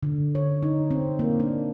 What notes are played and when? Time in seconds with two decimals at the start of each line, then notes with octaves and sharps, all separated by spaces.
0.03 D3
0.35 C#5
0.63 D#4
0.91 C4
1.19 A#3
1.40 D4